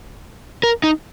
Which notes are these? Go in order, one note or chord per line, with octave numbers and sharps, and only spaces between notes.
A#4
D#4